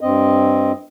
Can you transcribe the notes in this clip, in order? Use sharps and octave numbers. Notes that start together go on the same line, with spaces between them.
G2 C4 D#5